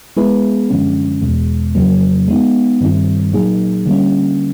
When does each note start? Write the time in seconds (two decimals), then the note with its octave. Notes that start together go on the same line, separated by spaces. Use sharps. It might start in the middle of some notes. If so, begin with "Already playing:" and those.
0.17 G#3 B3 E4 G#4 B4
0.69 F#2 D3 F3 G#3 C#4
1.22 E2 B2 G#3
1.75 F2 C#3 F#3 A#3
2.28 G#3 B3 D#4
2.81 G2 D#3 G3 C4 E4
3.33 A#2 F#3 A#3 D#4 G#4
3.86 D3 G3 A#3 C#4